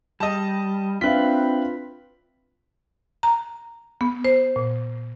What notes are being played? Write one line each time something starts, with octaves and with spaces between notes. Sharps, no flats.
G3 D#5 A5
C4 D4 F4 B4 E5 F5 B6
A#5
B3
C5
A#2